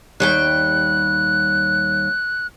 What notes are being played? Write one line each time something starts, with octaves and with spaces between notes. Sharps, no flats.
D#2 G3 G5 F#6